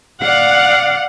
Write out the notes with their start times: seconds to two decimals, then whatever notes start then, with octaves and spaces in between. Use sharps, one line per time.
0.23 D5 F5 F#5